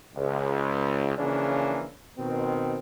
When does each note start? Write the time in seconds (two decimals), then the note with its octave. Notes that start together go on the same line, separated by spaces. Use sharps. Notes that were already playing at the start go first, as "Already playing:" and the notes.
0.16 C#2
1.18 C#3 E3 F3 A#3 C#4 D4
2.18 B2 D#3 C4